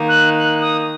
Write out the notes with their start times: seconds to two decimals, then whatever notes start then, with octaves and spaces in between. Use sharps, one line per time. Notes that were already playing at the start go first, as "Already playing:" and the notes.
Already playing: D#3 A#3 D#4
0.09 F#6
0.39 F#6
0.61 D#6